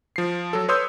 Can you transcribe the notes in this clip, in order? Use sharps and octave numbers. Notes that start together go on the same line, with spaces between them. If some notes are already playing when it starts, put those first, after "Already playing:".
F3 C7
F#3 A4
B4 C#5 C6 D#6 E6 G6